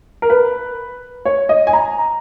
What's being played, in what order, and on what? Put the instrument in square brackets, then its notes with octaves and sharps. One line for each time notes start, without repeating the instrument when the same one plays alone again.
[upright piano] A#4
B4
C#5
D#5
G#5
A#5